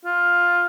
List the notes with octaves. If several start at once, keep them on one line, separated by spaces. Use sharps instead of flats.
F4